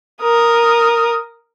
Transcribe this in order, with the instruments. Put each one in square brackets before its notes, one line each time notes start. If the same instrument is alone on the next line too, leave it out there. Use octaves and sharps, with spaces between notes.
[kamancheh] A#4 D#6